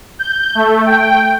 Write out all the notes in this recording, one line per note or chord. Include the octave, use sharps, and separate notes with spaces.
G6
A3
G5